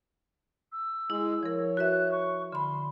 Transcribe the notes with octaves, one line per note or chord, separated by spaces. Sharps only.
E6
G#3 E4
F3 A#4 C#5
F#4 B4 E5 F#6
C#6
D3 B5 C6